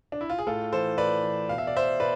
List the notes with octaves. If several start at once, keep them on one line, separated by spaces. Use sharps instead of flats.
D4
E4
F4
G#4
A2 F4 A4
E3 A4 C5
A2 B4 D5
E3
B2 F5
E5
D5
C5 E5
B2 B4 D5